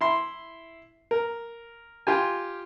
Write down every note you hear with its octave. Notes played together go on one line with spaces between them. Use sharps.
E4 C6
A#4
F4 G4 G#5